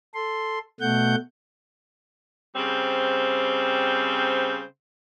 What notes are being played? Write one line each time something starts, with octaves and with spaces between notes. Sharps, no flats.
A4 C6
B2 A3 F#5 G6
C#3 G3 C4 C5